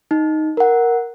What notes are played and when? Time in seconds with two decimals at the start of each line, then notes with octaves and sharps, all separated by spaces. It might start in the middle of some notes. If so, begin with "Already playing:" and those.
0.11 D#4
0.57 A#4 F#5